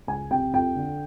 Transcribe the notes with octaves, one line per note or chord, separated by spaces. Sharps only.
C#2 G#5
C3 G5
F2 G5
D3